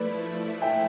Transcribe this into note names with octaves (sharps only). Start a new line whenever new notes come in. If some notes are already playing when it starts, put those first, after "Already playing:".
Already playing: F3 A3 E4 B4 D5
E5 G5